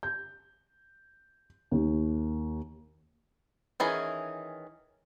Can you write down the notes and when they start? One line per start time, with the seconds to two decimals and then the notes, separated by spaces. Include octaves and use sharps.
0.03 G6
1.71 D#2
3.80 D#3 E3 C#4 G#4